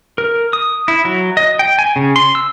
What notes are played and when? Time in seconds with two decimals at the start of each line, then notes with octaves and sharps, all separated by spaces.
0.18 A#4
0.53 D#6
0.88 E4
1.05 F#3
1.37 D#5
1.59 G5
1.79 G#5
1.96 C#3
2.16 C6
2.35 E6